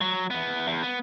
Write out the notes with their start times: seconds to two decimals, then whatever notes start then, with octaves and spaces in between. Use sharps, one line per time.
0.01 F#3
0.30 E2 B3
0.67 E2
0.83 B3